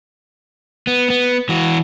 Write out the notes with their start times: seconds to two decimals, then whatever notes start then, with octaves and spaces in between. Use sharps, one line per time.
0.87 B3
1.10 B3
1.49 E3 F#4